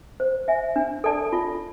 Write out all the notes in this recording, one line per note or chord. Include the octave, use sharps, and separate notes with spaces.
C5
E5 G#5
D4
A4 D5 A5
F4